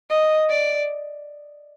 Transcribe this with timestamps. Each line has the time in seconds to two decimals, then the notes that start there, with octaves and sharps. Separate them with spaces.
0.10 D#5
0.50 D5